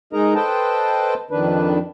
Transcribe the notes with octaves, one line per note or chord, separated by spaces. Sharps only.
G#3 D#4 G#4 A#4 D#5 A#5
A4 B4 C5 D#5 G5 A5
F2 D#3 D4 B4